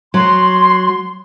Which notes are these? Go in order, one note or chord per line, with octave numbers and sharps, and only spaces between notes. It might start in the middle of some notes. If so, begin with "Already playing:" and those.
F#3 C6